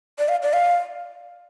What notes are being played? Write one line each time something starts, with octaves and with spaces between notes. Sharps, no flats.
D5
F5
D5
F5